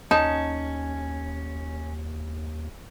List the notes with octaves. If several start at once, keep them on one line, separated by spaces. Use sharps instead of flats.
D#2 C#4 D#4 A5